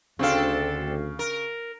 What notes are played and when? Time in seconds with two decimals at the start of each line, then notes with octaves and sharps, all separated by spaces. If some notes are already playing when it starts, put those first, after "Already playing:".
0.19 D2 C#3 C4 D4 A4 F5
1.19 A#4